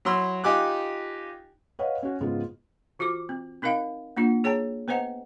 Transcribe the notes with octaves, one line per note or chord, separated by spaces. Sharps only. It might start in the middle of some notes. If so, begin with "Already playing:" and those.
F#3 E4 C6 E6
D#4 F4 G4 G#5 D6 F#6
B4 C#5 D#5 F5 F#5
C#4 F#4
G#2 C#3 G#3 B3 F4
E3 F4 F#4 A4 D6
C4
C4 D#4 A#4 D#5 F5 G5
A#3 D4 F4 F#5
G#4 C#5 G5 A5 A#5
B3 B4 C5 D#5 F#5 A#5